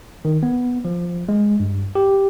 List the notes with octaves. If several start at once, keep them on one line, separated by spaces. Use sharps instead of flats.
D#3
B3
F3
G#3
G2
G4